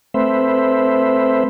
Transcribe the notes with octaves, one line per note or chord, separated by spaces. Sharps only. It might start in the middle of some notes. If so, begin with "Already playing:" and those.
A3 C4 B4 C5 E5